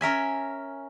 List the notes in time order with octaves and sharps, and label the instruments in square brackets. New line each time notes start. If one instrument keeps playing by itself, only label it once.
[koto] C#4 A#4 E5 G#5